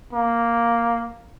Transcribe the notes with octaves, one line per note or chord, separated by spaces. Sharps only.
A#3